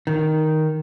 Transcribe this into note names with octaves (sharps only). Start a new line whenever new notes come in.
D#3